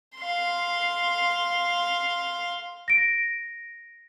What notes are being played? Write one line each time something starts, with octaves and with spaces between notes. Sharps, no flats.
F5 C6
A#6 D7